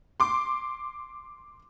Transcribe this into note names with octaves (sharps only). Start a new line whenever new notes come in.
C6 D6